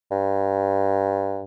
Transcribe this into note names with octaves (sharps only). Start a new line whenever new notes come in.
G2